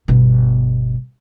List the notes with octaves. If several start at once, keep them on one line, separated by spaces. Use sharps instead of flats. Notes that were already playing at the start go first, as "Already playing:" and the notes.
G1 B2